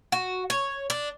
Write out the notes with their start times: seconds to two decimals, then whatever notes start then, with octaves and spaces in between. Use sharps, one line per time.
0.12 F#4
0.50 C#5
0.90 D4